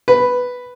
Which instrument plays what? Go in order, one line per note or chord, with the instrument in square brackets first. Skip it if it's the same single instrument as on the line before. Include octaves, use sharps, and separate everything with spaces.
[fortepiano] B4